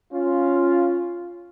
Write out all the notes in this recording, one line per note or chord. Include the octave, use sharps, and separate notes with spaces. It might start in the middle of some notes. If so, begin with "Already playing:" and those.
C#4 F4